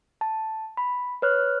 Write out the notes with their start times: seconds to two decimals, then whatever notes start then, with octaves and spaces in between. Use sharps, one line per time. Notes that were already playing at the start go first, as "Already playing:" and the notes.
0.21 A5
0.77 B5
1.22 B4 C#5 F6 F#6